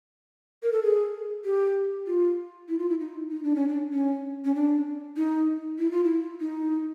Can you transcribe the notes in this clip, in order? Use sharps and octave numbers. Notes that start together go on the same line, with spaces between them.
A#4
A4
G#4
G4
F4
E4
F4
E4
D#4
D#4
D4
C#4
D4
C#4
C#4
D4
D#4
E4
F4
E4
D#4